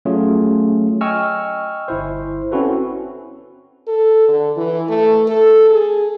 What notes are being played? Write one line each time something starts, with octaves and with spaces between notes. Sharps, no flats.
F#3 A3 C#4 F4 G#4
D#5 G5 G#5 C#6 E6 F6
G1 E4 C5
C4 C#4 E4 F#4 A4 B4
A4
D3
E3
A3
A4
G#4